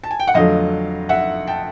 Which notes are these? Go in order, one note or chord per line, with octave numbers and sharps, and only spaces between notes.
A5
G#5
G5
F#5
F2 D3 F#3 A3 D#5 F5
E5 F#5
G5 A5